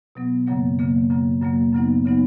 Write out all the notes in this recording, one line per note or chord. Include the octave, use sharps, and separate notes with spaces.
B2 F#3 B3
F#2 C#3 F#3 A#3
F#2 C#3 F#3 A#3
F#2 C#3 F#3 A#3
F#2 C#3 F#3 A#3
F#2 C#3 F#3 B3 D#4
C#3 F#3 B3 D#4